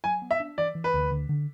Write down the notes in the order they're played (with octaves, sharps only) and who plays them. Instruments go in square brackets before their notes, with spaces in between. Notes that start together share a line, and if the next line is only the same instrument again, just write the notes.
[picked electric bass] F#3 [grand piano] G#5
[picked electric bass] B3
[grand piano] E5
[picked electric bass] D4
[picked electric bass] E3 [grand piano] D5
[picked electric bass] E3
[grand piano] B4
[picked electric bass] D2
D3
D3